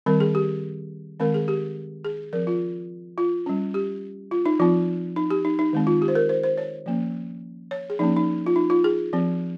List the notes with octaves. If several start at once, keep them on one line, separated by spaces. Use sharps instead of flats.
D#3 G3 C4 A#4
G#4
G4
D#3 G#3 C4 A#4
G#4
G4
G#4
F3 C4 A#4
F4
F4
G3 C#4
G4
F4
D#4
F3 C4 F4
D#4
G4
D#4
D#4
D#3 G#3 C4
F4
G4
C5
A#4
C5
C5
C#5
F3 A#3 C#4
C#5
G#4
F3 A#3 C#4 D#4
D#4
F4
D#4
F4
G#4
F3 C4